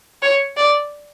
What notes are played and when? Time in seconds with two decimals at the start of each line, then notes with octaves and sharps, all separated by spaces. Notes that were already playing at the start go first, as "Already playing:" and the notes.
0.22 C#5
0.57 D5